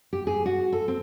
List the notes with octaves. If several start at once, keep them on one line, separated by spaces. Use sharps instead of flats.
G4
G#4
F#4
A4
C4